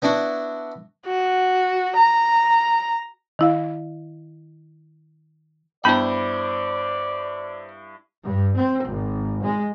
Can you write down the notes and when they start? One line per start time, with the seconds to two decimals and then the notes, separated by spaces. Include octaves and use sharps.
0.02 B3 D4 E4 F#4
1.07 F#4
1.96 A#5
3.39 D#3 E4 F5
5.85 G2 B3 D4 E4 C5 D5 A5 B5
8.24 G2
8.56 C4
8.87 G#1
9.43 G#3